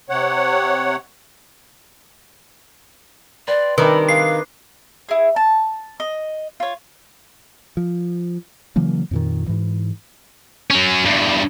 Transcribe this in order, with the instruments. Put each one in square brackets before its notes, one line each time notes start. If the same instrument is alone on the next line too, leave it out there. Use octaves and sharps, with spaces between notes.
[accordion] C3 C#5 F#5
[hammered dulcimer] B4 G5 C6 [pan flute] D5
[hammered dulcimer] C3 G3 D4 [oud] D#3 [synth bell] B4 [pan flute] B5
[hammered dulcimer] G#4 B4 [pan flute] F5 [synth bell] C7
[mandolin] E4 G#4
A5
D#5
F4 C#5
[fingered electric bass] F3
C#3 E3 F#3 A#3
F2 A#2 D#3
G#2 E3
[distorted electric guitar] F#3 C#4
E2 G2